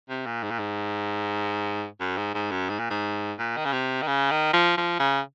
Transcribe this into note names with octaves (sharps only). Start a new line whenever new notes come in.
C3
A#2
G#2
A#2
G#2
F#2
G#2
G#2
F#2
G#2
A#2
G#2
A#2
D#3
C#3
C3
D#3
C#3
D#3
F3
F3
C#3